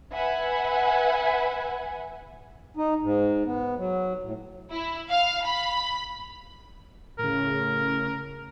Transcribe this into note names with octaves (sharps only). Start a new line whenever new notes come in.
B4 E5 F#5 G#5
D#4
G#2
B3
F#3
A2
E4
F5
B5
A2 C#3 A#4